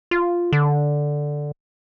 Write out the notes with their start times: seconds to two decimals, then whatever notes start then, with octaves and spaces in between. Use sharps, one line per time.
0.11 F4
0.53 D3